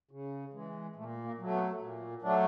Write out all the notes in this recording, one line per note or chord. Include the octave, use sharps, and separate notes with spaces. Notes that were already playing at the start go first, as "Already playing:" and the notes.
C#3
E3 G#3
A#2 A3
A#3
F#3 A3
B3
A#2
F#3 A3 D4